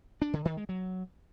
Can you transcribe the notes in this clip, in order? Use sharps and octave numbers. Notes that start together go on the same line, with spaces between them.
D4
D3
D#3
G#3
F#3